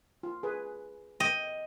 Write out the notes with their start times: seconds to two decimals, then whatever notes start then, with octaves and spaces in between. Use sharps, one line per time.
0.23 F4
0.43 G#4 B4
1.20 D#5 G5